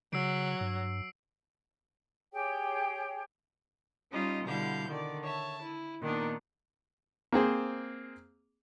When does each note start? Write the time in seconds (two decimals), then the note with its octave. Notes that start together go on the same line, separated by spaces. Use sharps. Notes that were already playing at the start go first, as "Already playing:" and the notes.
0.13 C#3 F#3 E6 C7 D7
0.61 G2
2.32 G4 G#4 C#5 G5
4.11 G3 C#4 D#4 F4 D#5
4.44 B2 D3 G3 E4 F5 G6
4.89 D3 D#3 D5
5.23 C#5 E5 A5
5.62 E4
6.01 A#2 D#3 B3 D4 D#4
7.32 A#3 C4 G#4 C5